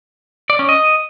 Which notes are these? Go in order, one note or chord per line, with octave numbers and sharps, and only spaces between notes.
D5
C#4
D#5